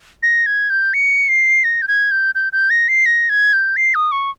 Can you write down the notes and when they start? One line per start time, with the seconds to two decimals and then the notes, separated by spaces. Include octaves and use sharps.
0.23 A#6
0.46 G#6
0.70 G6
0.94 C#7
1.29 C7
1.64 A#6
1.82 G6
1.88 G#6
2.11 G6
2.35 G6
2.53 G6
2.70 A#6
2.88 C7
3.06 A#6
3.29 G#6
3.53 G6
3.77 C7
3.95 D#6
4.12 C#6